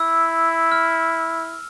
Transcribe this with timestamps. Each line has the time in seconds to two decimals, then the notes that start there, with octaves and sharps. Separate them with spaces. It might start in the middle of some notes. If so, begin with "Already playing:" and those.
Already playing: E4 E6
0.72 F6